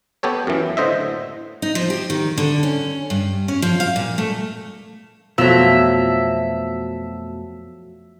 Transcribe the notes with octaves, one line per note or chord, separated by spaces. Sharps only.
B3 G4 A4 C#5
F#2 E3
A2 D3 C5 D#5 E5
D#4
F3
G4
D#3
D3
C#4
G2
C#4
F3
F5
A#2
A3
F2 B2 F3 F#3 A3 E5 A5